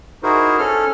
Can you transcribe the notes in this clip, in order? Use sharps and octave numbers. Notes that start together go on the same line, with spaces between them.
D#4 E4 F#4 G#4 A#4 C5
C#4 A4 F6